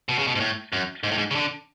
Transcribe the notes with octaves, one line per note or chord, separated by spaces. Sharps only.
B2
C#3
B2
G#2
A2
F#2
G#2
A2
G#2
C#3
D3